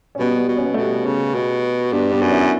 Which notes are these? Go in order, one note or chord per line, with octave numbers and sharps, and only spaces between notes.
C#4
B2 G3 B3
G3 B3
B2
C#4
B3
B2 A3
G3 B3
C#3
B2
G2 B3 D4
B3 D4
F#2
C#4 E4